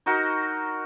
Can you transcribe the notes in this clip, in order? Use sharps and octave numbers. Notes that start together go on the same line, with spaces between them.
D#4 F#4 A#4